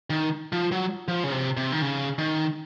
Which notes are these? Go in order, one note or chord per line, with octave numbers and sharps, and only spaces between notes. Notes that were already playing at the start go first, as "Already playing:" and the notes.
D#3
F3
F#3
F3
C#3
C3
C3
D#3
C#3
D#3